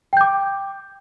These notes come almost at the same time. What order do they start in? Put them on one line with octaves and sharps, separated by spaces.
G5 G6 D6